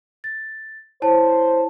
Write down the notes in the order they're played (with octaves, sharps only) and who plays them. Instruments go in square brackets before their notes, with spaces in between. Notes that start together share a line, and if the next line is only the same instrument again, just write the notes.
[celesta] A6
[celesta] E4 C#5 A5 [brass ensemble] C5